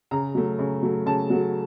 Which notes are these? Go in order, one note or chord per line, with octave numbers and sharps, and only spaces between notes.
C#3 A#5
F#3 A3
C#3
F#3 A3
C#3 A5
F#3 A3